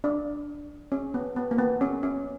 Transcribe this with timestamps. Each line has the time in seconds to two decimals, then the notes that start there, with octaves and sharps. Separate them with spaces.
0.04 D4
0.92 C#4
1.14 B3
1.36 B3
1.51 A#3
1.58 B3
1.81 C#4
2.03 C#4